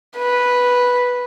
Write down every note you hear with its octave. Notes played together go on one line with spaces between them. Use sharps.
B4